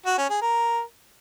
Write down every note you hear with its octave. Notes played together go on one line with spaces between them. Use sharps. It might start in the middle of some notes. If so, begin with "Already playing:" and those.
F#4
C#4
G#4
A#4